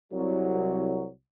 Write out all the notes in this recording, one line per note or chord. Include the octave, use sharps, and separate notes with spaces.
C2 F#3